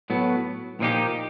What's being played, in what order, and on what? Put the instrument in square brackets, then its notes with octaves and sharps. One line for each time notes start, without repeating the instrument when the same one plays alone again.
[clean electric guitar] A2 F#3 B3
A#2 F3 A#3 D#4 G4